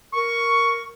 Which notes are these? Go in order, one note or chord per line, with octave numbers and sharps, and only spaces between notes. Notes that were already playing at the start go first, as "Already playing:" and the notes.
A#4 C#6